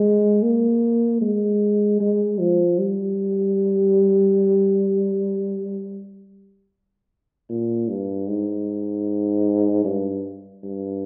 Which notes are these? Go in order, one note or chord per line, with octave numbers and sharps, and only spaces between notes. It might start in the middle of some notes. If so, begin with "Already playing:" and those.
Already playing: G#3
A#3
G#3
G#3
F3
G3
A#2
G2
G#2
G2
G2